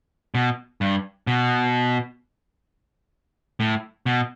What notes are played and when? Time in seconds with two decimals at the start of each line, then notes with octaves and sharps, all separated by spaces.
0.35 B2
0.81 G2
1.27 B2
3.60 A2
4.06 B2